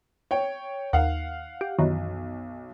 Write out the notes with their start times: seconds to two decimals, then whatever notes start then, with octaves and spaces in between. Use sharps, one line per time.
0.31 C#5 G5
0.93 D#2 F5 F#5
1.61 G4
1.79 B1 F#2 D#3 E3